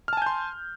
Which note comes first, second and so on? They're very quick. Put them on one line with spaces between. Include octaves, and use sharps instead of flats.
F6 A5 G#5 G6 C6